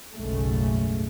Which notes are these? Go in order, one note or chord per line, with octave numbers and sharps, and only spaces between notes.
F#1 B1 G#2 C#3 G#3 A3